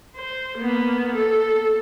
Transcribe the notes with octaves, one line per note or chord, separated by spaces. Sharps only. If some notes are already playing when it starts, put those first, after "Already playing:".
C5
A#3 B3
A4